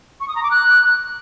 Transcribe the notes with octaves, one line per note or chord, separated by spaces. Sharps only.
C#6
D#6
A#5
D6
F#6